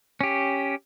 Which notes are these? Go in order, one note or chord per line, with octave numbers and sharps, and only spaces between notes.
C#4 G4